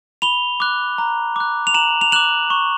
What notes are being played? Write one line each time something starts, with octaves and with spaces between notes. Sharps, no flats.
B5 F7 G7
D6 F#6
A#5
D6 F#6
F7
A#5 E7 F#7
F7
D6 F#6 E7 F#7
C#6